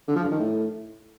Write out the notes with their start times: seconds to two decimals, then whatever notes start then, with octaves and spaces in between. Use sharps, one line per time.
0.08 D3
0.16 F3
0.24 G2
0.32 D#3
0.39 A2